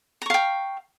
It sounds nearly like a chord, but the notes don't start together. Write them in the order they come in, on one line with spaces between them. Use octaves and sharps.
A#5 C#6 F5 G5